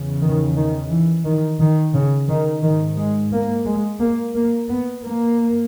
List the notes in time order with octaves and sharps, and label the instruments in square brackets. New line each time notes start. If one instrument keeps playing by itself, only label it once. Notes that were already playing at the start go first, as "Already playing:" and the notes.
Already playing: [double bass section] E2 C#3
D#3
D#3
E3
D#3
D#3
C#3
D#3
G#2 D#3
G#3
A#3
G#3
A#3
A#3
B3
A#3